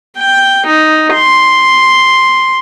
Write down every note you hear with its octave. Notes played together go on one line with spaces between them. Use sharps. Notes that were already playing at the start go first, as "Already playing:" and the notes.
G5
D#4
C6